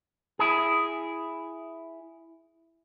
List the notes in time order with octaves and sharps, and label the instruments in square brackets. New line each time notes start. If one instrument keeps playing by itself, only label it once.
[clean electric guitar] E4 G#4